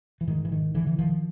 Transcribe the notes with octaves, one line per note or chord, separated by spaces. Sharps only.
E3
G#2 D#3
E3
D#3
D3 E3
E3
D#3 F3